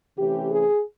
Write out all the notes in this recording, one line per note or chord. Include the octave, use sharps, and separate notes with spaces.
C3 E3 A3 C#4 G4
G#4